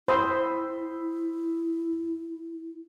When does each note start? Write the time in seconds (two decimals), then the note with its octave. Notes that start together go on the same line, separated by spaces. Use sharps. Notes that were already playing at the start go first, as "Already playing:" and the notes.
0.08 E4 C5 B5 D#6 E6